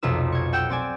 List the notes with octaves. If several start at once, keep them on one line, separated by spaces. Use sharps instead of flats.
B1 F2 C3 F4 B4 E6
C#6 G#6
F#5 G5 E6 G6
C4 D5 G#5